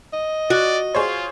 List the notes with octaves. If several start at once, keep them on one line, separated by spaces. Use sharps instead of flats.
D#5
F#4 D5
F4 G#4 C5 C#5